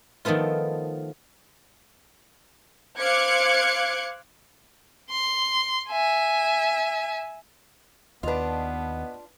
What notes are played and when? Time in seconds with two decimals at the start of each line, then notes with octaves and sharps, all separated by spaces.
0.25 D#3 F3 A3 B3 F4
2.99 C5 F5 D6 F#6 G#6 C#7
5.10 C6
5.89 E5 G#5
8.23 D#2 B3 D4 F4 B4 D#5